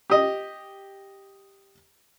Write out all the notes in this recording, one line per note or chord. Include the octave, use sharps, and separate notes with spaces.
G4 D#5